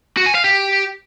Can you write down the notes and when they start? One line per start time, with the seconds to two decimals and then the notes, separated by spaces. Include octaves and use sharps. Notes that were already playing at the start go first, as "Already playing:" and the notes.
0.17 F#4
0.26 G#5
0.35 F5
0.44 G4